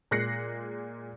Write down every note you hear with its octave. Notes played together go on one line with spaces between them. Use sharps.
A#2 G#3 F#6 A#6 C7 C#7